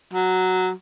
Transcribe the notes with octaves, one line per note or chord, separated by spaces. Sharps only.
F#3